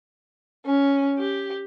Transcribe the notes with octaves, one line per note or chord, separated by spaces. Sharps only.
C#4
G4